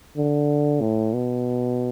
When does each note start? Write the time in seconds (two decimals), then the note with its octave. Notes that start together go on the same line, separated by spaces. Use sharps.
0.17 D3
0.81 A2
1.14 B2